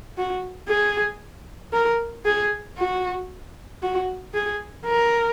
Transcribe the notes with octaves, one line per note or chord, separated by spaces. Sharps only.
F#4
G#4
A#4
G#4
F#4
F#4
G#4
A#4